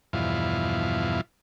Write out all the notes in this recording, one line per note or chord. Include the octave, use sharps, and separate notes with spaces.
E2 G2 B2 F3 E4 F5